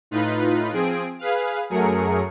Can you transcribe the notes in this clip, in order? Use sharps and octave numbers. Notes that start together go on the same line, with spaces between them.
A2 D#4 F4 B4
F3 C4 G#4 D7
G#4 B4 F5
F#2 F#3 A3 G#4 A#4 C#7